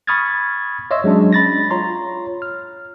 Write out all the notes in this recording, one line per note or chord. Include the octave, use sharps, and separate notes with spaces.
B5 C#6 D#6 F6 G#6 A6
C#5 D#5 E5 C6 E6
F#3 G#3 C#4 D4
B5 A6 A#6
F4 C#5 A#5 C6
F6